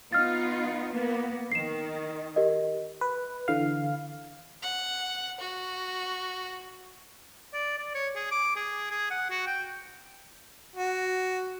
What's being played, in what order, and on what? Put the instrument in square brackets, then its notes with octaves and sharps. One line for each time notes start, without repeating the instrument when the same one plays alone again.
[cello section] B3 D#4 F4 [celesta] F6 A6
[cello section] A#3 B3
[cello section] D#3 [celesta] C7 E7
[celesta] G4 A#4 D#5
[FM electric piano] B4
D3 E3 F5
[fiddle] F#5
F#4
[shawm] D5
D5
C#5
G#4
D6
G#4
G#4
F#5
F#4
G5
[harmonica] F#4